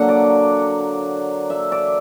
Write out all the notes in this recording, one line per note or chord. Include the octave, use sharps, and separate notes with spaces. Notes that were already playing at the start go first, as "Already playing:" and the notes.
Already playing: D3 F#3 A#3 F#5
D5
E5
D5